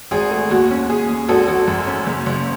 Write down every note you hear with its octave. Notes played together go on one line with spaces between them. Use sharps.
G#1 G#4
A3
D#2 F#4
C#4
D#2 G#4
D#2
G#1 F#4 A4
G#1 F#4
F#2
C#4
F#1
F#1